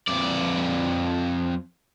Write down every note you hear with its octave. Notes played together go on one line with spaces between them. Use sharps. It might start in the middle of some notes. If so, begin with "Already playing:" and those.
F2 D5